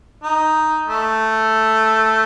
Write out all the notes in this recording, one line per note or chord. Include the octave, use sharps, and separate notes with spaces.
D#4
A3